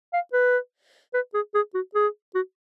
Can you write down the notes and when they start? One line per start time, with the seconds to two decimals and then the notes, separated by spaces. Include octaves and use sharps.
0.13 F5
0.33 B4
1.14 B4
1.34 G#4
1.54 G#4
1.74 F#4
1.95 G#4
2.35 F#4